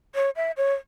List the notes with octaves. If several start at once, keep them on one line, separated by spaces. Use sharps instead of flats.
C#5
E5
C#5